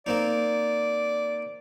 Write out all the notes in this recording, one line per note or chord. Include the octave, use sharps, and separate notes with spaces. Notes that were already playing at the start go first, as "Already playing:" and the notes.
A#3 C4 D#4 D5